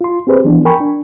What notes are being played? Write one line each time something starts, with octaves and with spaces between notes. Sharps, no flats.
F4 C6
C4 G4 G#4 B4 C5
E3 F3 B3 D4
A#4 G5 G#5 B5 C#6
D4